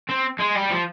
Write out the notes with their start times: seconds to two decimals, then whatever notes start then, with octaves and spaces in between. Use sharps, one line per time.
0.09 C4
0.39 G#3
0.55 G3
0.70 F3